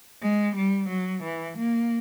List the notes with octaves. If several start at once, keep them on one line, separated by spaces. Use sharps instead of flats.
G#3
G3
F#3
E3
A#3